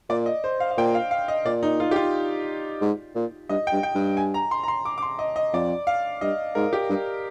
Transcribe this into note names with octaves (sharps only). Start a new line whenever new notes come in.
A#2 D5
D#5
C5
F5
F5
A#2 G5
F5
F5
D#5
A#2 D5
D#4
F4
G4
F4
G#2
A#2
G2 D#5
G5
G2
G5
G2
G#5
A#5
C6
A#5
C6
D6
D6
C6
D#5
D#5
F2 D5
F5
G2 D#5
G#2 A#4
G4
G2